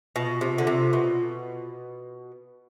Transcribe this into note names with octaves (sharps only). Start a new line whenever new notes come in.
B2 F4
C3
D3
C3
B2